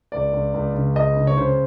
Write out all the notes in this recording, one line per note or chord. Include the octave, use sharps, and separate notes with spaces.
C#2 D5
C#2
C#2
C#3
C#2 D#5
C#3
C#5
C#3 C5